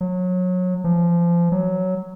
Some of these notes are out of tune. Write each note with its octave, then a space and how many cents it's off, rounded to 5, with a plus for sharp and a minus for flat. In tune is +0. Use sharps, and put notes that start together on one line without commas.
F#3 -25
F3 -25
F#3 +5